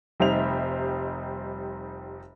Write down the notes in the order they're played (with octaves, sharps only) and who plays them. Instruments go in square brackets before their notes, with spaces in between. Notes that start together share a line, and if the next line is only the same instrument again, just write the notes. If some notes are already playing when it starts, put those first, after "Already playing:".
[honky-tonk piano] F1 G3 D#4 C5 E5 F7